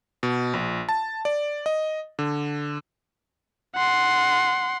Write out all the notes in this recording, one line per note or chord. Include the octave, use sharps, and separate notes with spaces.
B2
A#1
A5
D5
D#5
D3
F#5 C6